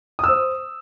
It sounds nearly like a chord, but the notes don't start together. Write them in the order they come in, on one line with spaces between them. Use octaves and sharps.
D#6 E6 C5